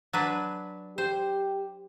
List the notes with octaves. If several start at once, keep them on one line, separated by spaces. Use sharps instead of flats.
F#3 D4 B4
G4 C5